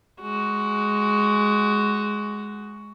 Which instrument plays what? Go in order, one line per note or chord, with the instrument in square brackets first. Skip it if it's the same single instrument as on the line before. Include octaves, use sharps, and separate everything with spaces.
[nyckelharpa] G#3 F#4